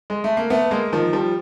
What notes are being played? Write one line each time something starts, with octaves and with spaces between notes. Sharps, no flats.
G#3
A3
A#3
A3 B3
G#3 A#3
D#3 F3
F3 G3